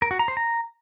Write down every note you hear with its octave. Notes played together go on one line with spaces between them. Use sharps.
A#4
F#4
A#5
C5
A#5